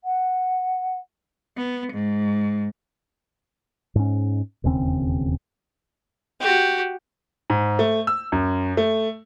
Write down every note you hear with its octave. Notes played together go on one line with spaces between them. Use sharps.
F#5
B3
G#2
G#2 C#4
E1 D#2 C#3 C4
F#4 G4
G#2
A3
E6
F#2
A3